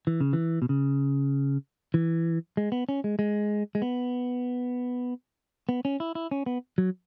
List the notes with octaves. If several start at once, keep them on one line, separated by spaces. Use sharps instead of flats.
E3
C#3
E3
B2
C#3
E3
G#3
B3
C#4
G#3
G#3
G#3
B3
B3
C#4
E4
E4
C#4
B3
F#3